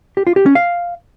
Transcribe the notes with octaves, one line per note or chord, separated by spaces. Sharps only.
G4
F4
G4
C#4
F5